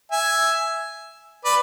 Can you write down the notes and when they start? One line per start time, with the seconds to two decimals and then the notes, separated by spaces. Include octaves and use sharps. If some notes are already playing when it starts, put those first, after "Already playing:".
0.12 E5 G#5
1.45 B4 D5